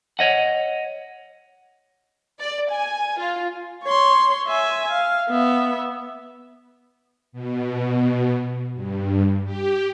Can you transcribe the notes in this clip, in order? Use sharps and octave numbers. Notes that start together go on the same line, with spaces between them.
C#5 D#5 F#5
D5
G#5
F4
C#5 C6
E5 G#5
F5
B3 E5
B2
G2
G4